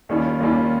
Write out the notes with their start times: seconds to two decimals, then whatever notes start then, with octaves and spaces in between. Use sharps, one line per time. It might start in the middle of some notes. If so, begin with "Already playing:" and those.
0.09 D#2 D#3 G3 C#4 F4
0.40 D#2 D#3 G3 C#4 F4